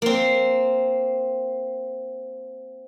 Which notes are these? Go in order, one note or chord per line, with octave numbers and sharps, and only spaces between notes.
A#3 C4